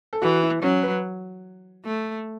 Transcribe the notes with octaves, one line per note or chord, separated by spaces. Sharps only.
A4
E3 F#4
E4
F#3 C#4
B4
A3